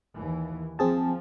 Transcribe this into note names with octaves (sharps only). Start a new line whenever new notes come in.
D#2 E3
F3 C4 G#4 A5